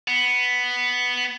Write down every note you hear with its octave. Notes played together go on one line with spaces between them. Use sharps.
B3